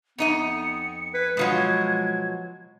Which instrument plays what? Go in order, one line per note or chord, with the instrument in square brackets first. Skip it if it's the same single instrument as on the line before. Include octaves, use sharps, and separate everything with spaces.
[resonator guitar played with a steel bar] F2 D#4 D#5 [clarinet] B3 [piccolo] C#7
[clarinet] B4 [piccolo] G#6
[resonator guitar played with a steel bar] B2 F3 F#3 [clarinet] G#3